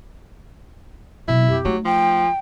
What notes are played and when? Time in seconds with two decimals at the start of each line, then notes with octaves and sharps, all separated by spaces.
1.28 B2 F#3 E4
1.48 F2 G4
1.65 F#3 A3 D#4
1.85 F3 G5